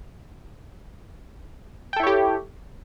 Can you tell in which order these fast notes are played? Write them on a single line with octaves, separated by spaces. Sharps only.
G5 A4 E4 C#5 G4